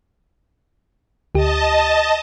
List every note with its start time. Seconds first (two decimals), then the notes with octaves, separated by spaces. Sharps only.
1.35 D2 G4 D#5 A5